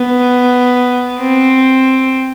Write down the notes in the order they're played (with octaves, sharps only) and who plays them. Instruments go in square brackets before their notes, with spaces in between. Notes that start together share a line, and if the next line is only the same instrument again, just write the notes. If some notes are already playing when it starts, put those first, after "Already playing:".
Already playing: [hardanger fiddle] B3
C4